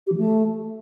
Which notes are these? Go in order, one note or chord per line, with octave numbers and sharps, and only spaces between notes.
G4
E3
A3